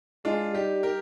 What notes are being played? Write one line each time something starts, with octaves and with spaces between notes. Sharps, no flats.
G#3 D4 F4
G3 D#4 G4
G4 A#4